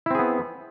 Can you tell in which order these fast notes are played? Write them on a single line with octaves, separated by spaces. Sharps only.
E4 C4 G#4 B3